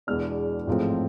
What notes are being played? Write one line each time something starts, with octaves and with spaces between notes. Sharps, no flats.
E2 B2 G#3 B3 D4 F6
A1 G#2 F3 A3 C4